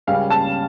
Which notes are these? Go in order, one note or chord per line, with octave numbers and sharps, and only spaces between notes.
C#2 C#3 G3 C#4 F5
A5